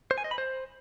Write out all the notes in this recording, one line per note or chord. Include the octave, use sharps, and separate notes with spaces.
C5
G#5
D#5
B5
C5